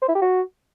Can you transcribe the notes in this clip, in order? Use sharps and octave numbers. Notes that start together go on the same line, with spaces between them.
C5
E4
G4
F#4